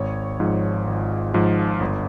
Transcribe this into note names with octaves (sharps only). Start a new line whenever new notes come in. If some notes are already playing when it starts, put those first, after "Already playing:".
Already playing: G#1 C#5
G#2 F3
G#1
G#2 F3
G1